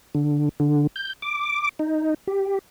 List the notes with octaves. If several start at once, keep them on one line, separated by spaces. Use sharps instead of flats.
D3
D3
G6
D6
D#4
G4